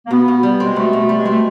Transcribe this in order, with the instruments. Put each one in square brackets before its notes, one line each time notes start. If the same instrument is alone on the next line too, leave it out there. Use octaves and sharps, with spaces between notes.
[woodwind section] A#3
[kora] B2 [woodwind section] B3
[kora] B2
G3
[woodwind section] G#3 [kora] C4
[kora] B2 [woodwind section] A3
[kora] B2
G3
[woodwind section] G#3
[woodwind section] A3 [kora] C4